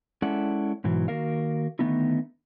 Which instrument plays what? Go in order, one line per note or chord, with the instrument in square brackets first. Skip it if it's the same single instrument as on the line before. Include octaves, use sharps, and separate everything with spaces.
[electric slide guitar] G#3 C#4 E4 A4 D5 F#5
G#2 B2 E3 F#3
D#3 A#3 F#4 A#4 F5
D3 D#3 A3 B3 D#4 E4